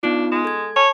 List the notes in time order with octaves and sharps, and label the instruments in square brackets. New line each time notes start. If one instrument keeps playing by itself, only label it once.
[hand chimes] B3 D#4 F4 [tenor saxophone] D4
[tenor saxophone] G#3
[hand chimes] A4 G#6
[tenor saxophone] C#5 [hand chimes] A5